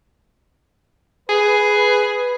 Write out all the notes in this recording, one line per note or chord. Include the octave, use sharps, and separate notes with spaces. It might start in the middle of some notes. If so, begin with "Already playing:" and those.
G#4 B4